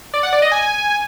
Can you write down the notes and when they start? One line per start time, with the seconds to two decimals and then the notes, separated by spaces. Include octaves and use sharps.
0.14 D5
0.23 F#5
0.33 D5
0.42 D#5
0.52 G#5